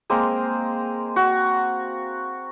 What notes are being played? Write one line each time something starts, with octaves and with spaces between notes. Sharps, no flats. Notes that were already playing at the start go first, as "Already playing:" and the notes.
G#3 A#3 C4
F#4